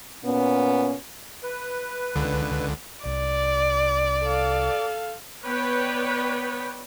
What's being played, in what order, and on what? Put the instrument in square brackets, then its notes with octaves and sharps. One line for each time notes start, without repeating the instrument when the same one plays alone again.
[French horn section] A#2 B3 C#4
[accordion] B4
[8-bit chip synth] C#2 D3
[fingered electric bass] C2 [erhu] D5
[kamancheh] A4 F5
[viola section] B3 B4 C#5 D5 G5